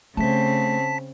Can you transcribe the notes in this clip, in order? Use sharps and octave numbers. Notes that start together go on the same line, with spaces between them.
C#3 A3 C4 A5 B6